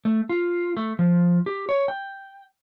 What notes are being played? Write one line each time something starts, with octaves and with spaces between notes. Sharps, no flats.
A3
F4
A3
F3
G4
C#5
G5